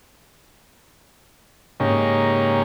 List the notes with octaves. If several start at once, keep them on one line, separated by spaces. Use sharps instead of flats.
G#2 C#3 A#3 C#4 D#4 G4